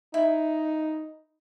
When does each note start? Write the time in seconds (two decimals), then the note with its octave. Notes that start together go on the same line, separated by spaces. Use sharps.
0.14 D#4 E4